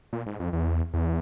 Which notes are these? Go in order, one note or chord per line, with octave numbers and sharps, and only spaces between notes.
A#2
G#2
F2
E2
E2